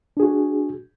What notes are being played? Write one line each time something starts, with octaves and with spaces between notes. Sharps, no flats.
D4 F#4 G#4